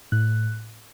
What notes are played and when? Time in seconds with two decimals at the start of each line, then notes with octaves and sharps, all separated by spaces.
0.12 A2 F#6